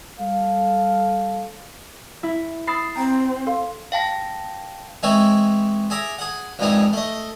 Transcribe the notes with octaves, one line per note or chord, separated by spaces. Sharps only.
G3 A4 F5
E4
B5 D#6 E6 A6 C7
C4 G5 A#5
A4 F5 C6
F5 G5 A5 A#6
E3 G#3 C4 E4 C#5
G#4 E5 A#5 D6
G#4 F#5
A#1 F2 G#2 E3 D#4 G#5
A3 D#5